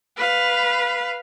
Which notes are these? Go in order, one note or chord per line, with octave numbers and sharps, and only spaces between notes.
B4 F5